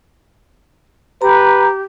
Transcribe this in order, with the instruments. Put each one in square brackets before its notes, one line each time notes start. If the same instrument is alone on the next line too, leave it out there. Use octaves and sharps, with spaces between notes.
[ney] G4 [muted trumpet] B4 [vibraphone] A#5